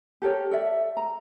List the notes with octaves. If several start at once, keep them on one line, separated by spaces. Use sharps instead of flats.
G4 A4 A#4 C#5
A4 D5 E5
A#5